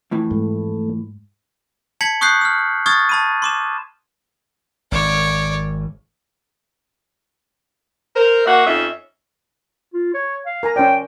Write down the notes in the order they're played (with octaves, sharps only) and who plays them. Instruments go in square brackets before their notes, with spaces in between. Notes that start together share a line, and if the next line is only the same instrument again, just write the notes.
[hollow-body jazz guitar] F2 A2 E3
[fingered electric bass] G#2 G#3 [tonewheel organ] A3
[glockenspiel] A5 G#6 B6 C#7 F#7
C#6 D#6 F#6 G6 C7
E6 F6
C#6 D#6 F6 G#6 A6
A5 B5 D#7
C6 D6 E7
[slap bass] G#1 [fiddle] C#5 D5
[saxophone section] A#4 C5
A#3 F#4 E5 F#5
F2 C#4 D#4 E5
[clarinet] F4
C#5
F5
[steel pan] A#4 G#5 A#5
[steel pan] C#4 C5 D5 [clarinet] G5